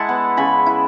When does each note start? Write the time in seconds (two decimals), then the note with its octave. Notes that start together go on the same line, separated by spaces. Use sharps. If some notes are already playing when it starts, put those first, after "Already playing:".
Already playing: G#3 E4 E5 F#5 A5
0.09 B3
0.37 C#3 G#5 B5
0.66 E4